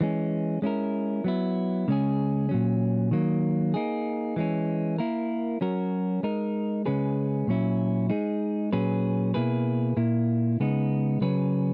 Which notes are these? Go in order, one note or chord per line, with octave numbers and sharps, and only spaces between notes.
E3 G#3 C#4
G#3 C#4 E4 A#4
F#3 B3 E4
C#3 G#3 C#4 G#4
A#2 F#3 C#4
D#3 F#3 A#3
A#3 D#4 G#4
E3 G#3 C#4
A#3 E4 A#4
F#3 C#4 F#4 A#4
G#3 D#4 A#4
C#3 G#3 C#4 G#4 B4
A#2 F#3 C#4 E4
G#3 D#4 G#4
A#2 F#3 C#4 G#4 B4
B2 A#3 E4 G#4 B4
A#2 A#3 E4
C#3 G#3 B3 D#4
C#3 F#3 C#4 G#4 B4